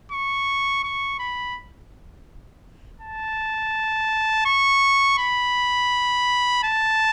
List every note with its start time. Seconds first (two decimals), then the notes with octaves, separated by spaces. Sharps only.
0.12 C#6
0.84 C#6
1.19 B5
3.01 A5
4.46 C#6
5.18 B5
6.64 A5